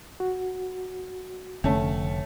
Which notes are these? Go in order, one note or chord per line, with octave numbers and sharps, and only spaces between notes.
F#4
F1 D3 A3 C#4